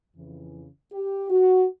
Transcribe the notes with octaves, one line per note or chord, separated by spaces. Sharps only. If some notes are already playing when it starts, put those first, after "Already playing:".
F2 C#3 E3
G4
F#4